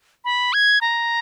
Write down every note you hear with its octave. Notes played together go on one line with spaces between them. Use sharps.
B5
G#6
A#5